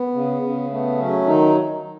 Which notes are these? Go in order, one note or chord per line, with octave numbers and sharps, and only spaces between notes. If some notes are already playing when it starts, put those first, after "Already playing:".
Already playing: B3
C#3
C#3
A3 B3
F#3 C#4
D#3 D#4